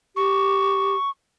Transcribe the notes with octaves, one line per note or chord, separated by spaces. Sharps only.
G4 C#6